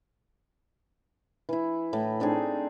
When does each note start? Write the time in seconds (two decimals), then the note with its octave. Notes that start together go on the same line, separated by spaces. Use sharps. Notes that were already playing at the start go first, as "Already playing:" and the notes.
1.49 E3 E4
1.93 A2
2.20 C4 D4 D#4 G#4